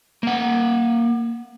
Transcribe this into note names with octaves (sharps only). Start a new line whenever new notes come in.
A#3 F#5